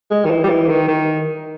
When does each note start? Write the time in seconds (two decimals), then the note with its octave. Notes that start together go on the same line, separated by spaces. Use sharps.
0.11 G#3
0.25 D#3
0.30 E3
0.43 G3
0.49 E3
0.69 D#3
0.88 D#3